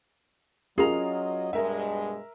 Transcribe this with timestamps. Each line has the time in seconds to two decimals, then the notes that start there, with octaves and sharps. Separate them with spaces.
0.78 F#3 C#4 F4 G#4 A#4 D#5 A#5
1.53 G2 B2 G#3 A#4 E5